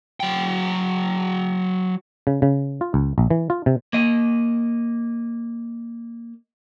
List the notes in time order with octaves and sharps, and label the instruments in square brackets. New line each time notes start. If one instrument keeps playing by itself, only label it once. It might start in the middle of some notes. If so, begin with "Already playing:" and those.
[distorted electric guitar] F#3 G5
[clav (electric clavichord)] C#3
C#3
F4
C#2
A#1
E3
F4
C3
[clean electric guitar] A#3 D#5